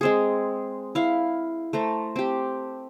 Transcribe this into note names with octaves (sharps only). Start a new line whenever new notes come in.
G#3 C4 G#4
E4 F5
A3 C5 A#5
C4 G4